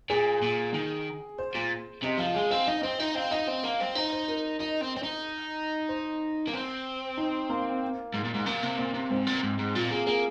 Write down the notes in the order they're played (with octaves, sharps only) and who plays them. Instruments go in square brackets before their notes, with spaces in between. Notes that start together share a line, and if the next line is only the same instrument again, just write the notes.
[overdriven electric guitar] A#2 [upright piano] G#4
[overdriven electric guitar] A#2
D#3
[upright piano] C5
[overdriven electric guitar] A#2
[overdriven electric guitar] C3 [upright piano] D#5
[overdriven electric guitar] F3 [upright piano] F5
[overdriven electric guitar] G#3 [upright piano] G#5
[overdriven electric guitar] C4 [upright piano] F5
[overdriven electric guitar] D#4 [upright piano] D#5
[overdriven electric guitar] C4 [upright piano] C5
[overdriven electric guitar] D#4 [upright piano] D#5
[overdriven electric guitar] C4 [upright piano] F5
[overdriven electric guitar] D#4 [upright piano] D#5
[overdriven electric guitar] C4
A#3
C4
[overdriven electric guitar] D#4 [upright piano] C5
[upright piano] C5
A#4
[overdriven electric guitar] D#4 [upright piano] D#5
[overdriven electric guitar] C4
C4
D#4
[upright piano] C5
[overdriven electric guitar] A#3
C4
[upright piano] D#4
A#3
[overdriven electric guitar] G#2
A#2
G#2
[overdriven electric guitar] A#2 [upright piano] A#3
[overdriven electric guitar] C3
[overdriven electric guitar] A#2 [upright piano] C4
[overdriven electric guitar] C3
[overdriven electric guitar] G#2 [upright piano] C4
[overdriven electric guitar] A#2
G#2
G#2
[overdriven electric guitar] A#2 [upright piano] F4
[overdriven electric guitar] A#3 [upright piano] G#4
[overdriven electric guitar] A#3 [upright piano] G#4